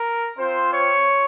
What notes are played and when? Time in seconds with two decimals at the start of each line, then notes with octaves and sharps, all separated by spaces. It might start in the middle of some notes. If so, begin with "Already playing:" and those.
Already playing: A#4
0.38 C4 F4 C5
0.72 C#5